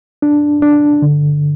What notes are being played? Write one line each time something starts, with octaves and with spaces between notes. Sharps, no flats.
D4
D4
D3